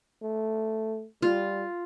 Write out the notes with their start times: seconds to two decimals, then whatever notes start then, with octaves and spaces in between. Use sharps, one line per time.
0.22 A3
1.22 G3 F4